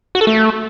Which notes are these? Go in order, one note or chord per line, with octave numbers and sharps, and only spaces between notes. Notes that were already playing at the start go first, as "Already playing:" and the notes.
F#4
A4
A3